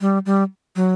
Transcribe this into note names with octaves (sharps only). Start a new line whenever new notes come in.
G3
G3
F#3